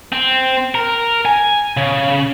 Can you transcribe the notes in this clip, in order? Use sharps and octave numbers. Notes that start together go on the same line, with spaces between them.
C4
A#4
G#5
C#3